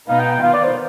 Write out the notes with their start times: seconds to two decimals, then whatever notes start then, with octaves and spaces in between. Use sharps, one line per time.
0.09 B2 B3 D#4 F5
0.19 G5
0.31 G5
0.42 D#3 B3 F4 F5
0.53 D5
0.64 C5